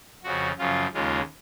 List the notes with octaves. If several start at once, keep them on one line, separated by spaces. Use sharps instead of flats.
F2 C#3 F3 F#4
F#2 C#3 F3 F4
D#2 C#3 G#3 F4